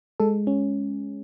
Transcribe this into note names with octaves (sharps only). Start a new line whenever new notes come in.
G#3 A4
C#4